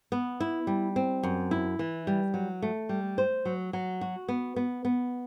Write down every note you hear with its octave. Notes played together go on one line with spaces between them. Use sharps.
B3
E4
G3
C4
F#2
E4
E3
G3
F#3
A3
G3
C5
F#3
F#3
F#4
B3
B3
B3